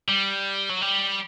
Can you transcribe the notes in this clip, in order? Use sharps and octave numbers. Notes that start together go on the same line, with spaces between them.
G3
F#3
G3